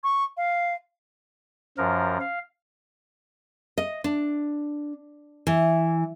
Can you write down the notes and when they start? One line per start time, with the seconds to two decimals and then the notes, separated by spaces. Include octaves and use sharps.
0.04 C#6
0.37 F5
1.78 F#2 F3 A#4
2.21 F5
3.78 D#5
4.04 D4
5.47 E3